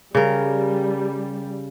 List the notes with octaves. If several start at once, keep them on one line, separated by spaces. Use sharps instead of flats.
C#3 G3 A#4